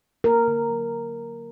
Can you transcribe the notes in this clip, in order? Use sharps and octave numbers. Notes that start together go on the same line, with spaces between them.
A#3 A#4
D3
F#3